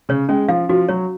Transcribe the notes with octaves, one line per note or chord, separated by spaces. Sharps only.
C#3 C#5
G#3 C#4
F3 F5
F3 F#4
F#3 C#5